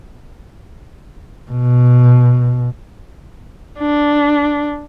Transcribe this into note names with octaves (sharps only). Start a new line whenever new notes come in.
B2
D4